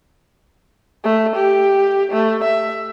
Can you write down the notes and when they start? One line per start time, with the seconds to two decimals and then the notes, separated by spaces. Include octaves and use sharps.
1.04 A3
1.36 G4
2.12 A3
2.44 E5